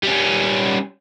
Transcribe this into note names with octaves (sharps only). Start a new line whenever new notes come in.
G3 C#4